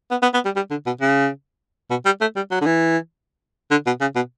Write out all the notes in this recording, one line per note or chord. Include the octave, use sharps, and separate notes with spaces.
B3
B3
B3
G3
G3
D3
B2
C#3
B2
G3
A3
G3
F#3
D3
E3
D3
B2
C#3
B2